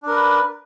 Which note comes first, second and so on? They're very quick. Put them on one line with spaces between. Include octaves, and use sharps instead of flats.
D4 A#4 B4